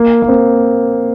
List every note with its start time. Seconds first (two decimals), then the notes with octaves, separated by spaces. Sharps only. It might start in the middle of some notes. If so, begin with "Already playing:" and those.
Already playing: A#3
0.22 A#3
0.28 C4